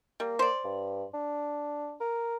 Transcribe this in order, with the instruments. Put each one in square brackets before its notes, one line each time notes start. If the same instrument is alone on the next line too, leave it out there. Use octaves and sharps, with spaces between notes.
[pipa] G3 [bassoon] A#3
[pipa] C5 D5
[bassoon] G2
D4
A#4